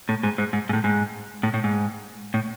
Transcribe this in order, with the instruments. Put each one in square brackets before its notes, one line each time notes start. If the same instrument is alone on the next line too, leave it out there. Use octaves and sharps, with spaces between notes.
[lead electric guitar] A2
G#2
G#2
G#2
G#2
A2
G#2
A2
A2
G#2
A2